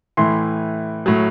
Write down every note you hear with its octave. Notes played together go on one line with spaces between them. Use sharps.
A2 E3 C6
A2 F#3